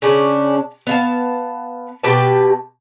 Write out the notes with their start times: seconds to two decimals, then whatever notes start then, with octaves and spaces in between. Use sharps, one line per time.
0.02 C#3 C#4 D4
0.87 B3 F5 A5
2.04 B2 G4 B4 A5